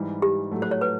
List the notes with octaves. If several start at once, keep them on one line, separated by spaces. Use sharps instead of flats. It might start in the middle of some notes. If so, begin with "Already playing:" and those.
Already playing: G#2 E3 G3
G4
A2 F#3 A3
C5
C#5
B4